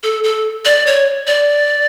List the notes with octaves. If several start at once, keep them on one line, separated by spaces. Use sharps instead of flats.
A4
A4
D5
C#5
D5